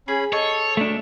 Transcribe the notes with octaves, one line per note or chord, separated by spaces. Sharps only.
C#4 G#4 B5
A4 C#5 D#5
A3 D4